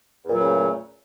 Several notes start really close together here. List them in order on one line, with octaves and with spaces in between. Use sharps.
E2 A#2 F#3 C#3 A3